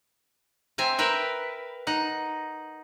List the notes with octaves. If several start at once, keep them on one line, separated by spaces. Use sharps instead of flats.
C4 E5 G#5 A#5
A#4 B4 E5 G5
D#4 F#5